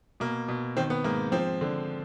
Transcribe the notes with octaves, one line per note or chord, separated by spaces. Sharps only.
B2 A#3
B2
D#3 C4
B3
G#2 A#3
F3 C4
D3